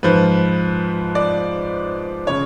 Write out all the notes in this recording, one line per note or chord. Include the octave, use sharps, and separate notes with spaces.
G#2 F3 B4
D5
C#3 C#5